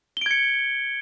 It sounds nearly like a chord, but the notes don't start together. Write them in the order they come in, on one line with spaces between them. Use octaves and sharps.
G7 D7 G#6 C#7